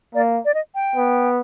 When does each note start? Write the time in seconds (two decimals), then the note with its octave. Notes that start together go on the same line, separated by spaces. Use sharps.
0.15 A#3 D5
0.45 D5
0.54 D#5
0.75 G5
0.96 B3